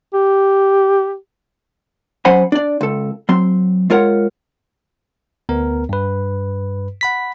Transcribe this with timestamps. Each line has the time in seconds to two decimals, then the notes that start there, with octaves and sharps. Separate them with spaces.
0.14 G4
2.25 F#3 C#4 C5 F#5 G#5 B5
2.52 D4 D5
2.81 C#2 A4
3.29 F#3 C4 C6
3.90 G#3 F4 A#4 C#5 F#5
5.49 D2 B3 A#4
5.89 G2 B4
7.01 F#5 B5 B6